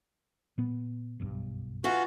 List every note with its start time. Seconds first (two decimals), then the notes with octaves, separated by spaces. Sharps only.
0.58 A#2 B3
1.20 F#1 B1 G2
1.84 E3 F4 F#4